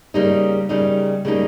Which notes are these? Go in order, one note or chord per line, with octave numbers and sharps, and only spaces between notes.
C#3 G3 A#3 D#4
C#3 G3 A#3 D#4
C#3 G3 A#3 D#4